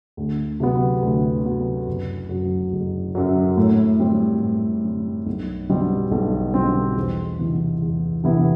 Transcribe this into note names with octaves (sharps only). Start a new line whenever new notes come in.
D2
C3 F#3 B3
D2
C3 F#3 B3
F#1
F#2 F#3
F#1
F#2 F#3
A2
G3 C4
A2
G3 C4
B1
B2 G3 C4
B1
B2 G3 C4
E2
C3 E3 B3 E4
E2
C3 E3 B3 E4